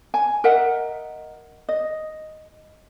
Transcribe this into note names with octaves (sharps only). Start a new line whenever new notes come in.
G#5
A#4 D#5 E5 F#5
D#5